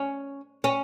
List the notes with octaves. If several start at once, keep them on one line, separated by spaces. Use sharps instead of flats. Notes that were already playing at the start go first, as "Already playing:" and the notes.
Already playing: C#4
C#4